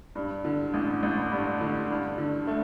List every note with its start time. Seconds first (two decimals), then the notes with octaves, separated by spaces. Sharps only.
0.15 G2
0.45 D3
0.74 A1
1.03 A1
1.31 G2
1.61 D3
1.90 G2
2.18 D3
2.47 A3